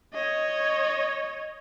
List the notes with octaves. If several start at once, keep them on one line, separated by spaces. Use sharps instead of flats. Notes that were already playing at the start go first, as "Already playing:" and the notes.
C#5 D#5